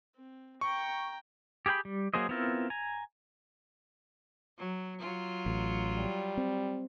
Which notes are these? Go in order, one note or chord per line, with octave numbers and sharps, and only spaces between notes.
C4
G5 A#5 C#6
G4 G#4 A#4 G5 B5
G3
F#3 A#3 G#4 C5 D#5
B3 C4 E4 F4 A#4
G#5 A#5
F#3
F#3 F4
A1
G3
C4